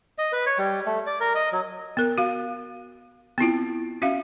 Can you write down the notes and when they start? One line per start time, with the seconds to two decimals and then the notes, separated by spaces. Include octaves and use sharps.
0.18 D#5
0.32 B4
0.46 C#5
0.58 G3
0.86 A3
1.07 D5
1.20 A#4
1.35 D#5
1.52 F#3
1.97 B3 A#4
2.18 F#4 F5
3.38 B3 C4 E4 F4
4.02 C#4 F#4 E5 F5